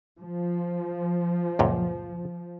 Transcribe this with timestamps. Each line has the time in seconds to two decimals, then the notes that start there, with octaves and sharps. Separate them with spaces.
0.20 F3
1.59 C#2 F#2 A#2